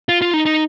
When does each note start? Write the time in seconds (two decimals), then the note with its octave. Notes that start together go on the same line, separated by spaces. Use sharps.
0.09 F4
0.22 F4
0.34 D#4
0.46 D#4